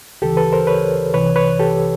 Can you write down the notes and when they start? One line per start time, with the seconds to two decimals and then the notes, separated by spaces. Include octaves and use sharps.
0.22 D2 C#3 E3 G4 A4
0.37 A4 B4
0.53 A#4 C5
0.67 B4 C#5
1.14 C2 C3 E3 B4 C#5
1.36 B4 C#5
1.59 G4 A4